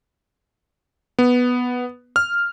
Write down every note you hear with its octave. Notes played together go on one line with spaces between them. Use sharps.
B3
F6